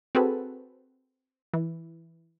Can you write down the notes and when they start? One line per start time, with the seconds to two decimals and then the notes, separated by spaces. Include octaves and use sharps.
0.15 C4 F#4 G#4 A4 B4
1.54 E3